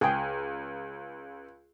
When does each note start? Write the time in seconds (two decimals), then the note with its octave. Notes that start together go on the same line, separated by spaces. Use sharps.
0.01 C#2 G#4 G5